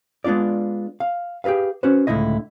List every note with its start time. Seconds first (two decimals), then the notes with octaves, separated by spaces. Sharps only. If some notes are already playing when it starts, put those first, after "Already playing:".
0.24 G#3 B3 D4 F4 D5
1.00 F5
1.44 G4 G#4 A#4 B4 F5
1.83 C#4 F#4 B4 C5
2.07 C#2 A2 D3 E4 D#5